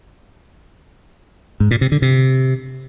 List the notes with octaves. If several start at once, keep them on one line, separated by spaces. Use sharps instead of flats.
G#2
A#2
C3
D3
C3